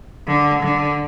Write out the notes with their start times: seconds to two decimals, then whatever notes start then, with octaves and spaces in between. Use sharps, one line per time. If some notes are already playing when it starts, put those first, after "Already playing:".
0.26 D3
0.62 D3